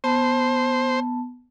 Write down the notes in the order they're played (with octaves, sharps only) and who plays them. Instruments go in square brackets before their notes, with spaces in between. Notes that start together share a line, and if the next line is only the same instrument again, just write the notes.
[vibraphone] B3 A5 [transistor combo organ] C5